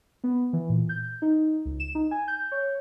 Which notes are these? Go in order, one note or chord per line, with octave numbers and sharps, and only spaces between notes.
B3
E3
A#2
G6
D#4
C#2
E7
D#4
G#5
G6
C#5